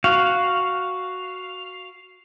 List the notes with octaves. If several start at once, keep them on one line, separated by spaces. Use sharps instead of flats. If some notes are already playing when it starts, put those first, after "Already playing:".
F#4 F5